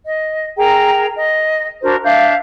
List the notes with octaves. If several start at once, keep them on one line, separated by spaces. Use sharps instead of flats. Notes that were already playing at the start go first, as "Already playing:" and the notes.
D#5
G#4 A#4 G5 A#5
D#5
D4 F#4 A#4 C5
D4 E5 F5 G6